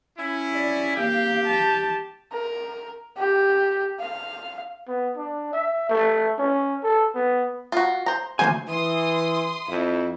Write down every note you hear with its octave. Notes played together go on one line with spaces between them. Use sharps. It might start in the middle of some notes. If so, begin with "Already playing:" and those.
C#4 E4
D5
A#3 G4 F5
A5
A#4
G4
F5
B3
D4
E5
A3
C#4
A4
B3
F4 F#4
C5 A#5
D2 E3 C5 G#5
E3 C6 D#6
F2 E4